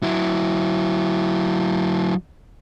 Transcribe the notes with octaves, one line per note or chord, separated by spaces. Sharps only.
F#3 E4